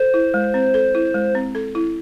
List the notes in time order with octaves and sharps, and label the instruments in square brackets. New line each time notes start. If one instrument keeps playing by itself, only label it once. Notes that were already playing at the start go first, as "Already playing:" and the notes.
Already playing: [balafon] A4 [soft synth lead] C5
[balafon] E4
G#3
C4
A4
E4
G#3
C4
A4
E4